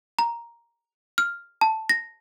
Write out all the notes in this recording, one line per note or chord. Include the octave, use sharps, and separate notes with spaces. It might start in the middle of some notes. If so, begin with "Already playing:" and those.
A#5
F6
A5
A#6